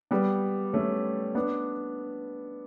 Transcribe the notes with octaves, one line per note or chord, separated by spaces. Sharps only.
G3 B3
A3 C#4
B3 D4